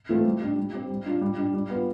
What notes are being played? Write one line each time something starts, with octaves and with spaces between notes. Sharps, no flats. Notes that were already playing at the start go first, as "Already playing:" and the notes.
E3 A3 C4 F4
G3
D4 G4
G3
C4 G4
G3
D4 F4
G3
D4 G4
G3
B3 F4